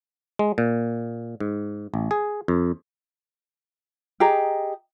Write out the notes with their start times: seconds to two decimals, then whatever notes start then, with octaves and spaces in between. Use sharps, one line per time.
0.39 G#3
0.58 A#2
1.40 G#2
1.94 A1
2.11 G#4
2.48 F2
4.20 G4 G#4 D#5 A#5